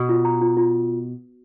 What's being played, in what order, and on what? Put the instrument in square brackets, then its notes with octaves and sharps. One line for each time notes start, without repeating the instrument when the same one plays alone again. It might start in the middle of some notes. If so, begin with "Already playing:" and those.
Already playing: [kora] B2
[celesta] F4
A#5
F4
F4